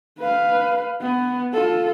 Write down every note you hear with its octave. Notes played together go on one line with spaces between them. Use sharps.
B4 F5
B3
F4 A4